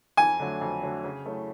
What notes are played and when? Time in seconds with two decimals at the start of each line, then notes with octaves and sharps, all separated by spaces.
0.17 F2 G#5
0.40 D3 F#3 A3
0.61 F2
0.83 D3 F#3 A3
1.04 C#3
1.26 F#3 A3 C#4 E4